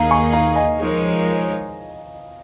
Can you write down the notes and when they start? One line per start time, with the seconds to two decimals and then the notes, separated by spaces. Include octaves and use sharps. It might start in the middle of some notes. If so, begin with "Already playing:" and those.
Already playing: D#2 D#3 A#3 D#4 G#4 F5 A#5
0.11 G#5 C#6
0.33 F5 A#5
0.56 D#5 G#5
0.78 F3 G#3 D#4 A#4 C#5